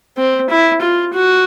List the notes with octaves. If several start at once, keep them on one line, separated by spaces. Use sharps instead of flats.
C4
E4
F4
F#4